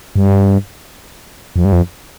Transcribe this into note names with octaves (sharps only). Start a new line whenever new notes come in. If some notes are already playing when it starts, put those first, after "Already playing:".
G2
F2
G2
F2